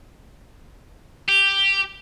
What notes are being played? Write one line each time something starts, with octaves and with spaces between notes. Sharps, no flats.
G4